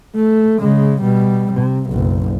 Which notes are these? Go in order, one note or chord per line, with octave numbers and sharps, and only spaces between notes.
A3
C#3 G#3
B2 G3
C3
F#1 B1